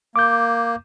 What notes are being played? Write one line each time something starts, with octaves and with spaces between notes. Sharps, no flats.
A#3 D6 G6